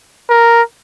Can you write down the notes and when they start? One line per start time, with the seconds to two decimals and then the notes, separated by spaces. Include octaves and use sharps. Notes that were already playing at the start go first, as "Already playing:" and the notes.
0.30 A#4